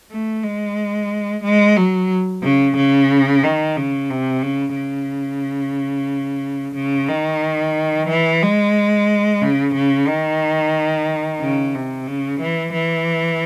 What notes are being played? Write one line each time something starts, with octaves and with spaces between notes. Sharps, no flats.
A3
G#3
G#3
F#3
C#3
C#3
D#3
C#3
C3
C#3
C#3
C#3
D#3
E3
G#3
C#3
C#3
D#3
C#3
C3
C#3
E3
E3